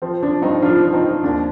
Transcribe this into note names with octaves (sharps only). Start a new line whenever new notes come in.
F3 C4
F3 D4
G2 C4 D#4
F3 D4 F4
F3
C4 D#4
F3
D#2 D4